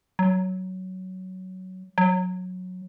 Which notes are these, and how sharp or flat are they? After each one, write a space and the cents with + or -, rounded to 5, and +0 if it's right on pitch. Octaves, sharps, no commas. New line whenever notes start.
F#3 +10
F#3 -15